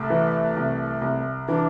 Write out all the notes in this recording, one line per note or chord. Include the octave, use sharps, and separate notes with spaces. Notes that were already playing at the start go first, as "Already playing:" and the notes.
Already playing: C2 A3
E3
C2
C2
E3 D4